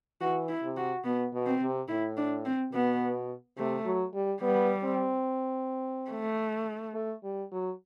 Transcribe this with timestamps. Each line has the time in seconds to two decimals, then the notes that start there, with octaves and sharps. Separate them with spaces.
0.21 E3 F#4
0.49 E4
0.63 C3
0.77 F#4
1.04 B2 B3
1.33 B2
1.47 C4
1.62 C3
1.88 A2 E4
2.17 D4
2.45 C4
2.73 B2 B3
3.57 C3 A3
3.85 F#3
4.14 G3
4.42 G3 B3
4.84 C4
6.11 A3
6.94 A3
7.24 G3
7.52 F#3